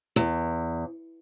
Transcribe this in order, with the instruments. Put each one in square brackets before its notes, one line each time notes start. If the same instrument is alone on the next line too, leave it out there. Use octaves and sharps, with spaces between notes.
[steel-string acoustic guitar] E2